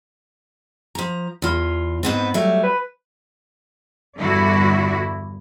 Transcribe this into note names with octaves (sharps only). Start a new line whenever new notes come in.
F3 A#5
E2 F4
G#2 B3 C4
F#3 G3 A3 E5
B4
E2 G2 D3 E4 F#4 D5